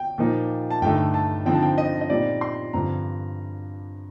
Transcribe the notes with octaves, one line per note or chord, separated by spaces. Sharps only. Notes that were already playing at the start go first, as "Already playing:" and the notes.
Already playing: G5
A#2 F3 A#3 D#4
A5
G2 D3 A3 D#4 G5
A5
D3 F3 C4 D#4 G5
A5
G5
D#5
D#5
A#2 G3 C4 D#4 D5
C6
G2 D3 F3 C4 A#5